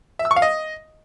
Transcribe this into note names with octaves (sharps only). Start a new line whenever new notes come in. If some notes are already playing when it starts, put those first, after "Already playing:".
E5
E6
C#6
F5
D#5